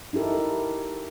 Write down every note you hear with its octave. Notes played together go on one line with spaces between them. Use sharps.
D#4 E4 G4 A4 A#4